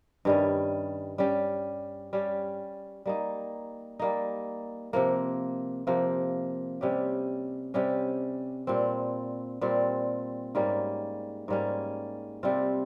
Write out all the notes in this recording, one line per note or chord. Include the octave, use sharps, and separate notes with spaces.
G2 D#3 G3 C#4
G3 C#4 G4
G3 C#4 G4
G3 A#3 D#4
G3 A#3 D#4
C3 F3 A#3
C3 F3 A#3
C3 G3 C#4 G4
C3 G3 C#4 G4
A#2 G3 C4
A#2 G3 C4
G#2 G3 A#3 C#4
G#2 G3 A#3 C#4
C3 G3 C4 F4